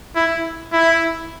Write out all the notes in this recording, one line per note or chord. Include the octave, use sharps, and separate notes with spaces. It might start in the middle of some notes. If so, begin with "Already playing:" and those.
E4
E4